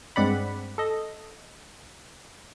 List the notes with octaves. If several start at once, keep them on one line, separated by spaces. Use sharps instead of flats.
G2 G#3 C4 D5 F#5 B5
A4 D#5